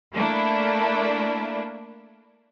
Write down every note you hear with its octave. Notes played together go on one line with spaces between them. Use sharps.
A3 A#3 D4 E4